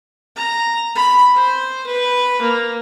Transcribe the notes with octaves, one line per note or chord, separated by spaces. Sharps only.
A#5
B5
C5
B4
A#3